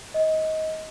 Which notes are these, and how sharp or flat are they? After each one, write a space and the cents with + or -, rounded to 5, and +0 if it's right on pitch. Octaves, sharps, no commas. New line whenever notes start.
D#5 +20